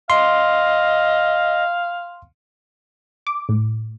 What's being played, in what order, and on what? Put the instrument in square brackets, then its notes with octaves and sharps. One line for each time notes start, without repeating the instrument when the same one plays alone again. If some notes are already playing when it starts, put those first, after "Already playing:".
[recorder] D#5 [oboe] F5 [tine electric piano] C6
[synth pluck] D6
A2